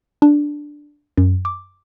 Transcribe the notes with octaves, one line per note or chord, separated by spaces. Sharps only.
D4
F#2
D6